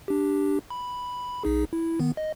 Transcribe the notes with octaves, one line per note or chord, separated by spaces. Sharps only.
D4 G4
B5
B1 D#4 G#4
E4
D#3 B3
D#5